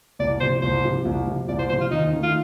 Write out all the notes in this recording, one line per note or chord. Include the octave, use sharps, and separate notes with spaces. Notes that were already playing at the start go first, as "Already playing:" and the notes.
C2 D5
C3 F3 C5
C2 C5
C3 F3
C2
C3 F3
C2 D5
C5
C3 F3 C5
F4
D#2 D#4
D#3 A3
F4